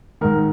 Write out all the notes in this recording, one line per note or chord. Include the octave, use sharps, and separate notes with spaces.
G#2 D#3 A#4